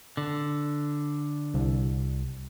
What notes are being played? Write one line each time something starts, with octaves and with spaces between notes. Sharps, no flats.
D3
C2